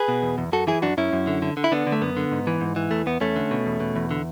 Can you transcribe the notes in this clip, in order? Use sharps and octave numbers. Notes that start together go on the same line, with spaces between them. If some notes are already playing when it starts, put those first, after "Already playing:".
Already playing: G#4 B4
B2
E2
E2
F#2 F#4 A4
E3 E4 G#4
F#2 D4 F#4
F#2 C#4 E4
F#2
D3
D3
D3
E4
D3 B3 D4
D3
A3
F#2 B3
D3
G#2
E3
G#2
E3
E2 A3
E2 B3
E2 A3 C#4
D3
B2
E2
B2
E2
D3